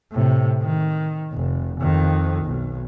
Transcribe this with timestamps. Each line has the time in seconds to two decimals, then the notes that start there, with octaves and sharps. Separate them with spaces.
0.12 A2 C3
0.62 D#3
1.33 F1
1.81 F2 D#3
2.45 B1